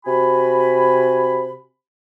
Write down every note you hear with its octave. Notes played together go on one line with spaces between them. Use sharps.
C3 F#4 G#5 B5